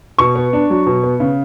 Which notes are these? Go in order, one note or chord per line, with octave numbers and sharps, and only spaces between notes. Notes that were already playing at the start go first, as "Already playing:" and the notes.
B2 C#6
B3
D4
F#3
B2
B3
C#3